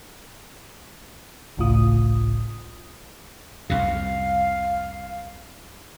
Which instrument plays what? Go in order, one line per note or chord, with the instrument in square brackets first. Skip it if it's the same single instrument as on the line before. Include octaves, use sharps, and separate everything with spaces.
[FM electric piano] G#1 C#2 A2 C#3 F4 D#6
[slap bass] C2 F2 C3 [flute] F5